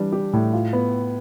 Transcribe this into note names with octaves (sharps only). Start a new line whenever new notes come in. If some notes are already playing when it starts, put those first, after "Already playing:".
Already playing: E3 G3 D4
G4
A2
F4
B3